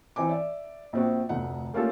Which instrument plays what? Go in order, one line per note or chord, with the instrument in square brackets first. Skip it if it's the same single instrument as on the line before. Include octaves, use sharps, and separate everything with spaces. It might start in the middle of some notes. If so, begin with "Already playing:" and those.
[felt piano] E3 C4 G#5 D6
D5 E5
A#1 C4 F#4
F1 D2 F#5
A3 A#3 C#4 F4 G4 A4